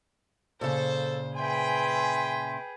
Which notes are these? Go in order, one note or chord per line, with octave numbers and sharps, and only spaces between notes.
A#2 C#3 A4 C5
G#4 B4 E5 G5 G#5 C6